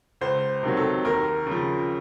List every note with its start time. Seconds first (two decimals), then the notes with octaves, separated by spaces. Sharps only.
0.21 C#2 C5
0.63 C3 D#3 F#3
0.77 A4
1.05 D#2 A#4
1.47 C#3 F3